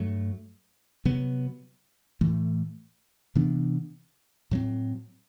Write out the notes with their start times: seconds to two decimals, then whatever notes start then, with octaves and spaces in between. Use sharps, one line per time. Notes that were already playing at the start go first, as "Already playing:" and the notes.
Already playing: G2 F#3 A3
1.05 C3 F#3 B3
2.21 A2 E3 A3
3.35 C3 E3 B3 D4
4.51 A2 F#3 C4